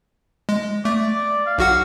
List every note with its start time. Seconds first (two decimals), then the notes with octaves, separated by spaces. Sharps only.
0.49 G#3
0.85 A3 D5
1.47 F5
1.58 B1 F#4 F#5